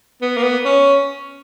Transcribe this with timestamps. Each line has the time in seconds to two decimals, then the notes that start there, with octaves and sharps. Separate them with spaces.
0.22 B3
0.37 A#3
0.43 B3
0.65 C#4